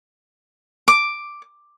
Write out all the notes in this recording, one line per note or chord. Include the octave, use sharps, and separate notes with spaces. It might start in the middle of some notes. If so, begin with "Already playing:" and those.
D6